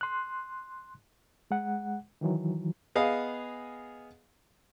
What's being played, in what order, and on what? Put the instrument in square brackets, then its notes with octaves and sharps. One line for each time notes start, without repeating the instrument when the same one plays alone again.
[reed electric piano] C6 F#6
G#3 F#5
D#3 E3 F#3
[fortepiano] B3 G#4 D#5 F5